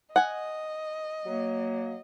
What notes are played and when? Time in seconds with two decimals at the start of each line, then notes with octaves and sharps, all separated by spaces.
0.16 D#5 F#5 G#5
1.25 F#3 A#3